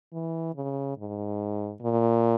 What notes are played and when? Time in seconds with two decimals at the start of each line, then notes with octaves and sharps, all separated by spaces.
0.13 E3
0.55 C#3
0.97 G#2
1.81 A#2